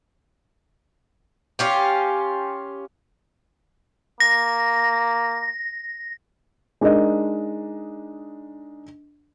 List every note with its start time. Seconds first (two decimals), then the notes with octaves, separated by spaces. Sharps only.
1.59 C#4 F4 G4
4.20 A#3 A#6
6.81 G#3 D4 D#4 A#4 D#5